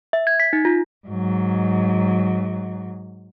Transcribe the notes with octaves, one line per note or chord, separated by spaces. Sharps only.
E5
G#6
B6
D#4
F4
G#2 F#3